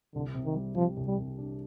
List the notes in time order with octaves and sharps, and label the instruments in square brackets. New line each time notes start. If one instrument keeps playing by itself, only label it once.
[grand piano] C2 [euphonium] D3
[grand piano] C3
[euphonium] D#3
[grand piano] G3
[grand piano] C3 [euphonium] F3
[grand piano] C2
[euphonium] G3
[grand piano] C2
D4